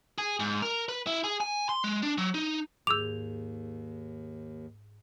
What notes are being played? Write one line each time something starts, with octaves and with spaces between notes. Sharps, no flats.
G#4
G#2
A#4
B4
E4
G#4
G#5
C6
G#3
D4
F#3
D#4
D#2 G#2 G#4 D6 E6 G6 F7